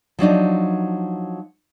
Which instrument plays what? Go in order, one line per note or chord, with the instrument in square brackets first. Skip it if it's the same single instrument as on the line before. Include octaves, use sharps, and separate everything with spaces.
[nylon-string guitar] F3 F#3 D4 D#4